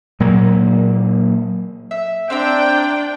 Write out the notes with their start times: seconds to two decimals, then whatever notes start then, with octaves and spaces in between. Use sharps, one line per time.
0.20 A#2 F#3 A#3
1.91 E5
2.30 C4 D4 G5 A#5 E6